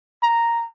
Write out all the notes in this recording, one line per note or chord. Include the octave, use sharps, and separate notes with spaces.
A#5